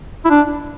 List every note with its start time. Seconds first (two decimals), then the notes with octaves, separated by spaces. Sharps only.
0.25 E4
0.30 D4